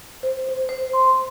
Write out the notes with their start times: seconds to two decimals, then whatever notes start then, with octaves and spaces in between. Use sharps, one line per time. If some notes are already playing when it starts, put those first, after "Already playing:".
0.23 C5
0.49 C5
0.69 C5
0.93 C6